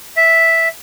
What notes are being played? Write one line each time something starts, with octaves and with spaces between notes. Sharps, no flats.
E5